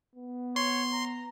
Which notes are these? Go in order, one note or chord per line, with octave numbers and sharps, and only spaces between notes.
B3
C#5 C6
A#5